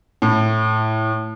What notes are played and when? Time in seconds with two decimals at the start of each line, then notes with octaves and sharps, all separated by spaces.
0.22 A2